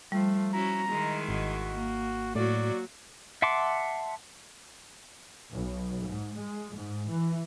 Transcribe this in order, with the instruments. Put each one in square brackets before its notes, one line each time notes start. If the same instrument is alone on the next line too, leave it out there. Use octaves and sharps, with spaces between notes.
[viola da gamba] F3 [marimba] G3 [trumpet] A3
[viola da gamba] C#4 E4 F#4 [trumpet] A#5
[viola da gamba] D#3 G#3 E4
[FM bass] G#1 [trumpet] F#4
[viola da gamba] A#3
[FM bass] A2 [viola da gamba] F#3 A#3 F#4 [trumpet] D5
[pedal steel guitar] E5 F#5 A5 C6 D6
[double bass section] B1
G#2
G#3
G#2
E3